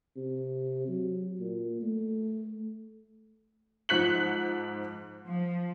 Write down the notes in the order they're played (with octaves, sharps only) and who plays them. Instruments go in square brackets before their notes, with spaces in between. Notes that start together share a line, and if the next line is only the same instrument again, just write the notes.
[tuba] C3
F#3
A#2
A3
[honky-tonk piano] G#2 F3 F#6 B6 C#7 F#7
[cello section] F3